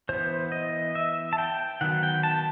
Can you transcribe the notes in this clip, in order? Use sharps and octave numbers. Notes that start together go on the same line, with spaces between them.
E3 B3 C5
D#5
E5
A5
G5
D#3 F#3 B3 F#5
G5
A5